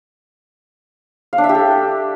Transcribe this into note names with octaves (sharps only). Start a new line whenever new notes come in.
F5
D4
E5
G4
A4